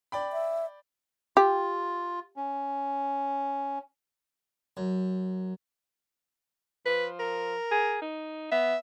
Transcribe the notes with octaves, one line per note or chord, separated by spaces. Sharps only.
D5 G5 B5
E5
F4 G4
C#4
F#2
F3 B4
A#4
G#4
D#4
B3 E5